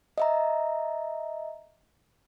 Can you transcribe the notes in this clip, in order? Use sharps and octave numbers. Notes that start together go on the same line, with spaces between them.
D#5 E5 A#5